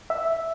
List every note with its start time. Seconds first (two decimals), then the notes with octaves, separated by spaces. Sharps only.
0.10 E5